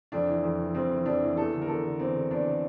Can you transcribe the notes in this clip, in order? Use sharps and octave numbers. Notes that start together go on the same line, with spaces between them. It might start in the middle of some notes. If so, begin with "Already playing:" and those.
F2 D4
E3
F2
E3
F2 C4
E3
F2 D4
E3
E2 A4
D3
A#4
E2 A4
D3
E2 C4
D3
E2 D4
D3